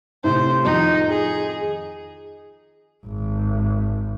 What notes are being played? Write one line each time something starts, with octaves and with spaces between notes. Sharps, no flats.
A2 C3 C5
F2 D#3 D#4
G#4
G#1